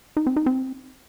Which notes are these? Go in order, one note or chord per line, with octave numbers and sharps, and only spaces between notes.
D#4
C4
D#4
C4